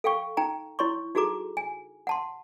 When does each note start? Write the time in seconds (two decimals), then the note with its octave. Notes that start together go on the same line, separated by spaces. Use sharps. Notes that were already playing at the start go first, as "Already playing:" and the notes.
0.04 A4 F5 G5 C#6
0.37 D#4 G5 A#5
0.79 E4 C#5 C6 C#6
1.15 D#4 F#4 G#4 A4 A#5 D6
1.57 G#5
2.07 F#5 A5 C6